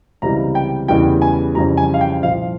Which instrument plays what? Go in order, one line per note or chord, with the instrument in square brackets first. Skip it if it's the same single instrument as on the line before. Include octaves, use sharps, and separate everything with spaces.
[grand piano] C#2 C3 E3 G3 A#5
G5
E2 C#3 E3 G3 G5
G#5
F2 C#3 E3 G3 A#5
G#5
F5
G5
C2 A#2 F3 F5